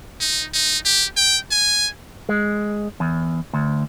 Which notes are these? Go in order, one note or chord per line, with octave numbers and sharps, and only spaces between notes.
D#4
D#4
G4
G5
G#5
G#3
E2
D2